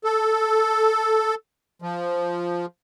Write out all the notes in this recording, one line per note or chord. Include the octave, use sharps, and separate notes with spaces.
A4
F3